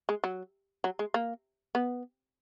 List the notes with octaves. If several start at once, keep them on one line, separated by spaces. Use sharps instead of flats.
G#3
F#3
F#3
G#3
A#3
B3